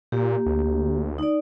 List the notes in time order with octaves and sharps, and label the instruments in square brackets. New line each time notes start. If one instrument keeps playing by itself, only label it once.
[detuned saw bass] A#2 [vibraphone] A#3 G4
[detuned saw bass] D2
[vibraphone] D#4 D5